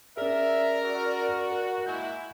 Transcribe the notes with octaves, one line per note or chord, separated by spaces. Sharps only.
C#4 G#4 A#4 D5 E5
F#4
A#4
G#3 A#3 E4 G#5 G6